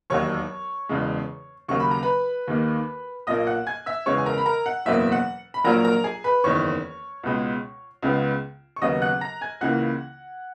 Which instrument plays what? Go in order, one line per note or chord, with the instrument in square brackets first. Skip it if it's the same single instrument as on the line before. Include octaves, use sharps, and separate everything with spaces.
[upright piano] E1 D#2 D#3 F#3 C#5 C#6
E1 E2 C#3 G#3
D#2 C#3 F#3 A#3 C#6
B5
A#5
B4 B5
D#2 D#3 A#3
B1 A#2 A#3 D#5 D#6
F#5 F#6
G#5 G#6
E5 E6
E2 C#3 G#3 B3 C#5 C#6
G#5
A#4 A#5
B5
A#4 A#5
F#5
F#1 E2 B2 F#3 A#3 E5
F#5
B5
A#1 A#2 F#3 A#3 A#4 A#5
A#4 A#5
G#4 G#5
B4 B5
F#1 E2 D#3 C#5 C#6
C#2 B2 G#3
C#2 C#3 G#3 B3
C#6
D#2 C#3 F#3 B3 D#5 D#6
F#5 F#6
A#5 A#6
G#5 G#6
C#2 C#3 E3 A#3 F#5 F#6